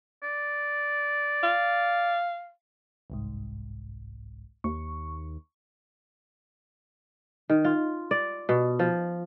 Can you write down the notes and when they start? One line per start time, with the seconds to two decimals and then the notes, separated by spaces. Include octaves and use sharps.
0.23 D5
1.43 F5
3.10 G1 C2 G#2
4.64 D#2 C#6
7.50 D#3
7.65 F4
8.11 D5
8.49 B2
8.79 F3